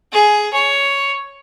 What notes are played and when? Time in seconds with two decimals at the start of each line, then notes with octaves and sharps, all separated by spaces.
0.12 G#4
0.53 C#5